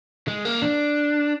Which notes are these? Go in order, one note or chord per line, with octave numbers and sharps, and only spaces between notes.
G#3
A#3
D4